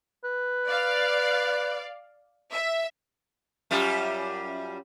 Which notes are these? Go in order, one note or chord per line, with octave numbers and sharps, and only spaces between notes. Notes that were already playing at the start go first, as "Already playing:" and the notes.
B4
D5 F5
E5
F#2 G3 F4